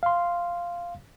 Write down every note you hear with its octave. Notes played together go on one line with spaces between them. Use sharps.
F5 C6